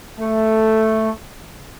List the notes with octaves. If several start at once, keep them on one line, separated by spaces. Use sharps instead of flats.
A3